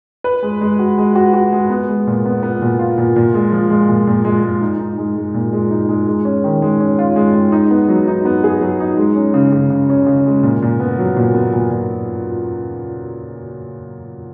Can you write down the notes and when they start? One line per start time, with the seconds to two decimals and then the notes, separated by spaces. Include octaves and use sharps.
0.24 B4
0.43 G#3
0.61 G#3
0.79 F#4
0.98 G#3
1.15 F#4
1.33 F#4
1.53 G#3
1.70 B3
1.89 G#3
2.07 A#2
2.25 B3
2.43 B3
2.62 A#2
2.79 F4
2.98 A#2
3.16 A#2
3.34 G#3
3.52 F3
3.70 G#3
3.89 A#2
4.07 A#2
4.25 G#3
4.43 G#3
4.61 D#4
4.79 D#4
4.97 G#3
5.16 G#3
5.34 A#2
5.53 G#3
5.70 D#4
5.89 G#3
6.07 G#3
6.25 C#4
6.44 D#3
6.62 G#3
6.80 C#4
6.99 F4
7.16 G#3
7.34 G#3
7.52 D#4
7.71 B3
7.89 F#3
8.08 D#4
8.25 B3
8.44 G#4
8.61 F#3
8.80 D#4
8.98 G#3
9.16 C#4
9.34 C#3
9.52 C#3
9.70 C#3
9.90 C#4
10.07 C#3
10.26 G#3
10.43 A#2
10.62 A#2
10.80 B3
10.98 F#3
11.17 A#2
11.34 B3
11.53 A#2
11.71 A#2